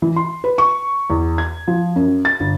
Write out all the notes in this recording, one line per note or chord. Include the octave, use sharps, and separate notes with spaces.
E3
C6
B4
C#6
E2
G#6
F3
F#2
A6
G1